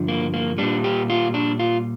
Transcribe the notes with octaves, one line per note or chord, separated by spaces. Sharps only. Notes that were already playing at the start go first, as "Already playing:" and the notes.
Already playing: G2 D3 F3
A#3
A#3
A#2 G3 D4
G4
F4
D4
F4